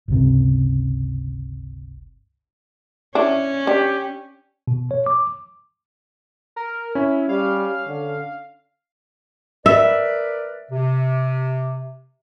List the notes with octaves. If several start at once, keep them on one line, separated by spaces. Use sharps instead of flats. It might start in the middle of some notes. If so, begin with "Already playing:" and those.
G1 C#2 C3
C#4 D4 E4
D4 G4
B2
C#5
D6
A#4
C#4 E4
G3 F5
D3
A#4 B4 D5 E5
C3